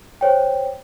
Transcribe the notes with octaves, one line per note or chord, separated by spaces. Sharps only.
C5 C#5 G5